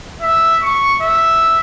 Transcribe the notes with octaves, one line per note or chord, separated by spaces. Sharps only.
E5
C#6
E5